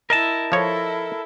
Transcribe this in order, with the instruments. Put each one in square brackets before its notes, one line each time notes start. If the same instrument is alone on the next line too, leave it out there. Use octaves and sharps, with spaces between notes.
[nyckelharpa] E4 E5 [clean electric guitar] A#4 D#5 A5
[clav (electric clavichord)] F3 C#5 [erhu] E4 [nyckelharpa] A4